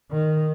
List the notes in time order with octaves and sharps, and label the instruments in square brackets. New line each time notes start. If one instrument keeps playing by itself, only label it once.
[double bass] D#3